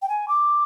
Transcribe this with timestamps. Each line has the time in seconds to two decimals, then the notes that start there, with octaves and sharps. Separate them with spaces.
0.02 G5
0.09 G#5
0.28 D6